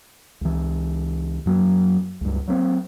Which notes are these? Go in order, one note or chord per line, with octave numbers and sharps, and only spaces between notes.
C#2 E3
F#2 F#3 A#3
C#2 G2
F#3 A#3 C4